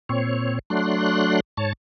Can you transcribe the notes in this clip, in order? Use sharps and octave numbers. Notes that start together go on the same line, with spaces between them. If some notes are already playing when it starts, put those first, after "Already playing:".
A#2 C4 C#5
F#3 A3 D4 C6 F#6
G#2 C#5 A5